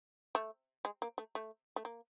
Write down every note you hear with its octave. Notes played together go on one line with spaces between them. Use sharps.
A3
G#3
A#3
A3
A3
A3
A#3